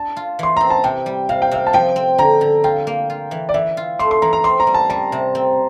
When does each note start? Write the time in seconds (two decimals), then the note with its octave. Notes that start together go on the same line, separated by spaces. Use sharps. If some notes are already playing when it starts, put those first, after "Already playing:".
Already playing: D4 A5
0.17 F4
0.39 E3 C6
0.57 C4 A#5
0.70 A5
0.84 C3 G5
1.06 G3
1.29 C3 F5
1.42 G5
1.51 C3 F5
1.67 A5
1.73 F3 G5
1.96 C4
2.18 D3 A#5
2.41 D3
2.64 F4 G5
2.87 A#3
3.10 F4
3.31 E3
3.49 D5
3.54 E3 E5
3.77 F4
3.99 A3 C6
4.11 C6
4.22 E3 A#5
4.33 A#5
4.44 C4 C6
4.60 A#5
4.67 G3
4.74 A5
4.90 G3 A5
5.12 C3
5.35 C4